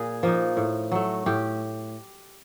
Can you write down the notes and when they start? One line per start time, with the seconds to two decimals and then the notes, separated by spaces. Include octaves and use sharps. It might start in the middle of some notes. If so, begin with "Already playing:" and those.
Already playing: A#2 G#4
0.23 F3 A#3 D#4
0.57 A2
0.92 F#3 A3
1.26 A2 G4